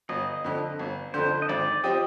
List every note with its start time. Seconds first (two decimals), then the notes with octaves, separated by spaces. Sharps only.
0.09 G1 D#5
0.44 F2 D3
0.79 G1
1.14 F2 D3 C5
1.42 D#5
1.49 G#1 D5
1.84 F3 C4 G4 D#5